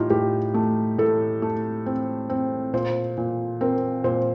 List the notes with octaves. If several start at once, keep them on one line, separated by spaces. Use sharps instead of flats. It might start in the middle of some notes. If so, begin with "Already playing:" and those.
Already playing: A2 D#4 F4 G4
A2 G4
A3
A2 A4
A3
C4
C4
A#2 C5
A#2
C4 A#4
A#2 C5